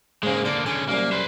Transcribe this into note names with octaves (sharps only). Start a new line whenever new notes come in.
G#2 C#3 G#3 A#3
D3 A#3 D5
D3 C#4 G#4
C2 F#2 G3 A#3
B4 C5